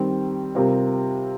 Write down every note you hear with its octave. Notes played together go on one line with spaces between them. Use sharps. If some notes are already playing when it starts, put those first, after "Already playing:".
Already playing: D#3 G3 C4
C3 G3 C4 F4 A#4